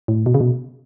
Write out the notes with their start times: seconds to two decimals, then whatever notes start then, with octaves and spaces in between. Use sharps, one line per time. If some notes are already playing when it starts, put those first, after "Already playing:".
0.08 A2
0.26 B2
0.34 C#3
0.40 B2